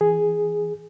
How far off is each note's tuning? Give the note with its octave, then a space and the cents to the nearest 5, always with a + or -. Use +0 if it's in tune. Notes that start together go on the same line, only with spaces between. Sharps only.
E3 +0 G#4 +0